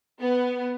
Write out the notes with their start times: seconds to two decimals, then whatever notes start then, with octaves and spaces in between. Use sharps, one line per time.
0.20 B3